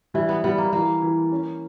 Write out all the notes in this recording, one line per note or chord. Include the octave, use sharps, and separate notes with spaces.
E3 G3
B3
G3 B3
A#3
E3 A#3
E3
C#4